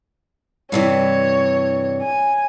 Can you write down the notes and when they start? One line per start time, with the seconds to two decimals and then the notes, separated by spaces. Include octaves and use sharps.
0.72 G2 C3 E3 C#5
2.02 G#5